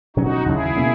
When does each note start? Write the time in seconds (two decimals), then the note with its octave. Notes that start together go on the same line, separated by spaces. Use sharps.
0.16 B2 F#3 C#4 D#4 F#4
0.46 D#2 C#3 F#3 E4 G#4
0.76 B2 A#3 C#4